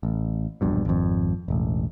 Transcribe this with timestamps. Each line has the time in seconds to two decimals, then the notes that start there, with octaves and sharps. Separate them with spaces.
0.03 A1
0.61 E1 A#1 G2 B2
0.85 G#1 F2
1.48 E1 A1